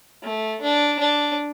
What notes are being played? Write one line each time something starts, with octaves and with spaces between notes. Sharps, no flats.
A3
D4
D4